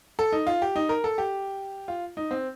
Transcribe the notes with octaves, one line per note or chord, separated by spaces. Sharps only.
A4
D#4
F4
G4
D#4
A#4
A4
G4
F4
D#4
C4